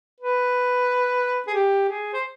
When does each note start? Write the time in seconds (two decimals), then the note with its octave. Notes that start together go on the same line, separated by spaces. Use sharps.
0.20 B4
1.47 G#4
1.54 G4
1.89 G#4
2.13 C5